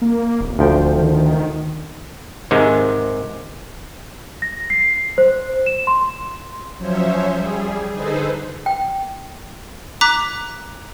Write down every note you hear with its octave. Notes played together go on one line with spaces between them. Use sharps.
A#3
D1
D2 F3 G5
D#3
G#2 C3 D#3 G#3
A#6
C7
C5
E7
C6
F3 F#3 C#4 C5 C#5 E5
G3 G#4
D3 D#4 G#4 A4 B4 C5
G5
A#5 D6 F#6 B6